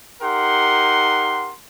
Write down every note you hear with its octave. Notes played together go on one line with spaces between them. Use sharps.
D#4 G4 A#4 F#5 C6